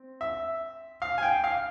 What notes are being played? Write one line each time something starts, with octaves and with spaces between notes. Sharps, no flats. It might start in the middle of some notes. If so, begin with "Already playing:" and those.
Already playing: C4
E5
F5
G#5
G5
F5